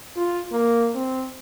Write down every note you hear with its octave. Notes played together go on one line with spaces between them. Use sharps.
F4
A#3
C4